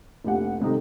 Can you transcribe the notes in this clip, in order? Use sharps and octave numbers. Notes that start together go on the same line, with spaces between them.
F1 A#1 G4 F#5
G#1 C3 G3 D#4 A4